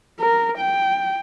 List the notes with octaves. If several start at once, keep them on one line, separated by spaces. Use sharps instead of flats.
A#4
G5